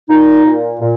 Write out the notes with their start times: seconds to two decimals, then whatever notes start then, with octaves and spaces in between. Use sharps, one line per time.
0.09 A#2 D#4
0.46 A#2
0.80 A#2